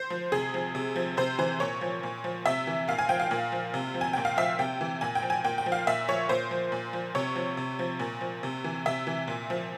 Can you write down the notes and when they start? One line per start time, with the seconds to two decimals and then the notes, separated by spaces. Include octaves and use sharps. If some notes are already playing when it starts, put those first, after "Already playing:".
Already playing: C5
0.10 F3
0.32 C3 G#4
0.54 F3
0.75 C3
0.96 F3
1.17 C3 C5
1.39 E3 C5
1.60 A#2 C#5
1.81 F3
2.03 A#2
2.24 F3
2.46 C3 E5
2.67 E3
2.88 A#2 F5
2.99 G#5
3.09 F3 G5
3.20 F5
3.31 A#2
3.52 F3
3.74 C3
3.94 F3
4.01 G#5
4.13 A#2 G5
4.25 F5
4.37 F3 E5
4.59 C3 G5
4.81 E3
5.01 A#2 G#5
5.15 G5
5.23 F3
5.30 G#5
5.44 A#2 G5
5.58 G5
5.66 F3
5.72 F5
5.87 A#2 E5
6.08 F3 C#5
6.29 A#2 C5
6.51 F3
6.72 A#2
6.93 F3
7.15 C3 C#5
7.35 F3
7.57 C3
7.79 F3
7.99 A#2
8.21 F3
8.43 C3
8.64 E3
8.86 C3 E5
9.07 E3
9.28 A#2
9.50 F3